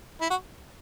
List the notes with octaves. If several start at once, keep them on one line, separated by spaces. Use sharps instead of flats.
E4
F#4